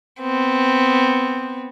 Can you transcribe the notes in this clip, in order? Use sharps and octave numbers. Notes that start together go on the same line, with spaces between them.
B3 C4